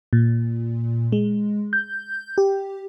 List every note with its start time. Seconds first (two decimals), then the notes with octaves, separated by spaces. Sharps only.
0.13 A#2
1.12 G#3
1.73 G6
2.38 G4